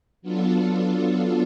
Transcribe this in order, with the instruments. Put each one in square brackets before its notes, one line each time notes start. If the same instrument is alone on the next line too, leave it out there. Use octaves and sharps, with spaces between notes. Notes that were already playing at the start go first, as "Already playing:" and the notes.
[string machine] F#3 B3 D4 F4 A4